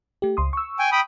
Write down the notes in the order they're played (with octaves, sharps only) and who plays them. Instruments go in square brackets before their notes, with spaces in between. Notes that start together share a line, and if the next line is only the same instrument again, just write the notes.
[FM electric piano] A3 G4
C#2 C6 D#6
C#6 E6
[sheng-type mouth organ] G5 G#5
G5 B5 D#6